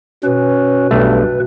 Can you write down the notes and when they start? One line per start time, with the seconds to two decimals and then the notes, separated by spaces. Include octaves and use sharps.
0.24 B2 C#4 B4
0.91 B1 G2 A3